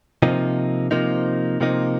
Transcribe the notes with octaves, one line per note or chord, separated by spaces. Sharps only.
C3 F3 A#3 D#4
C3 F3 A#3 D#4
C3 F3 A#3 D#4